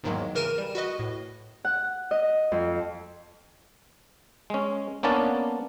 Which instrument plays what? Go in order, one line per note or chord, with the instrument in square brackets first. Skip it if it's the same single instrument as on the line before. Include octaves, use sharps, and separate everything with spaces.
[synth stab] E2 G#2 D#3 F#3 G#3 A#3
C#3 E3 A#4 F6 D#7 E7
G3
F#4 B4 D#5
A2
[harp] F#5
D#5
F2
[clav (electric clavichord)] G#3 C#4
A#3 B3 C#4 D4 A5